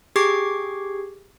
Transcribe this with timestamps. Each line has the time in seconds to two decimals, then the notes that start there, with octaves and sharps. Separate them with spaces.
0.16 G4 G#4 C#6 D6 G#6 C7